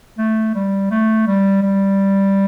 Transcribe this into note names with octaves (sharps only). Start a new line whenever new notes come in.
A3
G3
A3
G3
G3